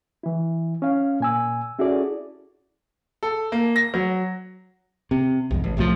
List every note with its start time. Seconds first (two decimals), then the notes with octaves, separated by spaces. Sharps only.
0.23 E3 E4
0.82 C#4 F5
1.20 A#2 G#5 E6
1.79 C#4 E4 F#4 G#4 A4 D5
3.23 A4
3.52 A#3
3.76 A#6
3.94 F#3
5.11 C3
5.51 C2 F2 G#2
5.64 A1
5.77 C2 A2 D3 F3